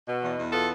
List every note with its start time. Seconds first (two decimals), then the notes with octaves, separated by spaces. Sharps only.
0.09 B2
0.23 E2
0.38 E2
0.53 B3 F4 A4